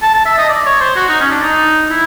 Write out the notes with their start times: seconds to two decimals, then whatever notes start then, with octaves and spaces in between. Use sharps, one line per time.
0.02 A5
0.14 A5
0.26 E5
0.38 D#5
0.49 D5
0.66 C#5
0.80 C5
0.96 F#4
1.09 D#4
1.21 C#4
1.31 D4
1.43 D#4
1.90 E4